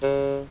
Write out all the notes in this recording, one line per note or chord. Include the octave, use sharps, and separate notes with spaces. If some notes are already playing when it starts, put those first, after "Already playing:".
C#3